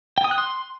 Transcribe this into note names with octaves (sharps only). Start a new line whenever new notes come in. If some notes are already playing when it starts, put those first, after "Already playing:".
G5
D#6
F#6
C6